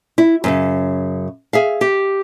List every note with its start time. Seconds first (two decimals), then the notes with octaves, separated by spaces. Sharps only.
0.18 E4
0.44 F#2 A#2 C#3
1.53 G#4 E5 F5
1.81 G4